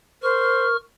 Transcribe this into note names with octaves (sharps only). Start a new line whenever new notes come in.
A#4 C5 C#6 F6